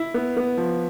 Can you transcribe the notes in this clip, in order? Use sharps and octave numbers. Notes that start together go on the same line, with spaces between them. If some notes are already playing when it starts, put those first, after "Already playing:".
Already playing: E4
B3
B3
F3